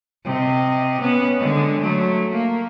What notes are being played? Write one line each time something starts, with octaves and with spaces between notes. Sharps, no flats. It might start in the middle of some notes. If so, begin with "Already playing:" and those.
C3 D#5
B3 C#4
D3 G#3
F#3 A3
A#3